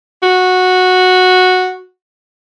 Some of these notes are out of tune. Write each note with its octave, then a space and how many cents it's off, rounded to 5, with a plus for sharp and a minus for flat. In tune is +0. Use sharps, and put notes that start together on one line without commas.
F#4 -10